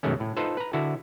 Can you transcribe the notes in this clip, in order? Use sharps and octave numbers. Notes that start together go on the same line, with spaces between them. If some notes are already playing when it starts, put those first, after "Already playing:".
F#2 B2 D#3 G#3 A3 C#4
A2
D#4 F4 A4 B4 C5
B4 A#5
D3 E4 F#4 A5